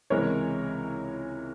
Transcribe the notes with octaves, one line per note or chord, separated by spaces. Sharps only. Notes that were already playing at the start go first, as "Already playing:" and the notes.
C#2 C3 E3 G#3 A#4 C#5